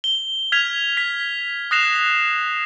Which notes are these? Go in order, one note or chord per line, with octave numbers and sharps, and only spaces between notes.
G7
F6 G#6 B6 F7
B6
D#6 F#6 A#6 C7 E7 F7